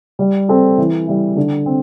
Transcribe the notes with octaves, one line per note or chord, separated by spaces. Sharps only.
G3
C4 A4
E3
G3 E4
D3
C4